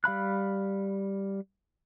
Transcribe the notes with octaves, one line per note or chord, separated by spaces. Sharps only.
G3 F5 B5 F#6